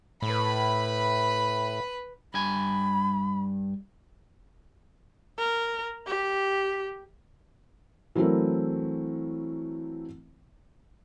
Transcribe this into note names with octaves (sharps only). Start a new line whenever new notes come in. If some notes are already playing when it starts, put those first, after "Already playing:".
A2 B4 B5
G2 G#5 B5
A#4
G4
E3 F#3 A3 C4 E4 A#4